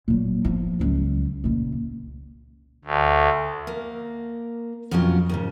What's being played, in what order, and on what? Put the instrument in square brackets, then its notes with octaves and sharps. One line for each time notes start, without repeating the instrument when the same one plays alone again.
[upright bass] A#2 F#3
F3 B3
C#2 F#3
C#2 A#2
[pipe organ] D2
[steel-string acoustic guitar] A#3
F2 B2 F#3 C#4 F4
D#2 G#2 C#3